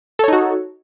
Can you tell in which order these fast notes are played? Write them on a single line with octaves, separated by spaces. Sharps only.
A4 C#5 D#4 F#4